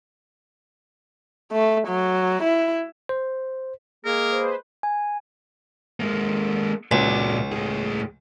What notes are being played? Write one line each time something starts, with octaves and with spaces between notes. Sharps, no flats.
A3
F#3
E4
C5
G#3 A#3 G#4 A#4
B4 C5
G#5
G#3 A#3
C#2 A#2 F#3
A2 G#4